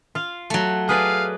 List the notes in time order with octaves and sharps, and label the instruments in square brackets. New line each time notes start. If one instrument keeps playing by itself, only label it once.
[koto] F4 F5
[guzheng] F#3 A3
[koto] G#4 B4 D5 [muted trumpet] F5